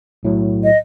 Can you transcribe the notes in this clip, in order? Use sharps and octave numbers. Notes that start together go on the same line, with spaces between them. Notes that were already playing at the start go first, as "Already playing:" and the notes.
B1 A2 F#3
D#5